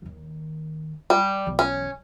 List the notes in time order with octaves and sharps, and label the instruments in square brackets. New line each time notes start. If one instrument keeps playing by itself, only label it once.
[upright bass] D#2 D#3
[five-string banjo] G3
[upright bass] B1 E3
[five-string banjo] C#4